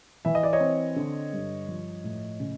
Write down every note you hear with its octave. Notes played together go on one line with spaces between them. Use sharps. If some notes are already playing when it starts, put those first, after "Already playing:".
E3 E5
D#5
D5
C#5 D#5
C4
D3
G2
F3
A2
C#3